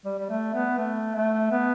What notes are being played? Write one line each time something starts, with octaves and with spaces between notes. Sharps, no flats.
G3
G3
A3
B3
A3
A3
B3